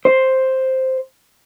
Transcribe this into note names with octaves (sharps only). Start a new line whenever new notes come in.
C5